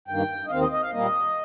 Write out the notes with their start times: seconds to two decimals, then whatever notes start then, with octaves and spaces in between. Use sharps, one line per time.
0.08 G2 D#3 A#3 G5
0.46 D#5
0.50 D#2 D#3 C4 F5
0.61 D#5
0.72 D#5
0.82 F5
0.92 A#2 G3 A#3 D#5